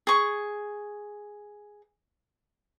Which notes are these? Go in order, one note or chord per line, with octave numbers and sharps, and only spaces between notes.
G#4 C#6